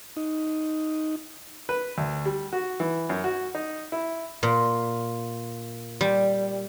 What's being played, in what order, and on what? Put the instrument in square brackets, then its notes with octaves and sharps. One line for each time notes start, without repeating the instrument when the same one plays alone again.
[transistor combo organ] D#4
[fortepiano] B4
D2
G3
F#4
E3
F#2
F#4
D#4
E4
[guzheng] A#2
G3